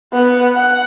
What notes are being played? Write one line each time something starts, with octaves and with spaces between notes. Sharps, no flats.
B3
F#5